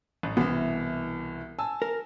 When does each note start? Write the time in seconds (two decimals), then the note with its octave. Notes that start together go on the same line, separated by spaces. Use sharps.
0.23 A1
0.37 C2 B2 E3 B3 E5
1.58 G#5 A5 E6
1.82 A#4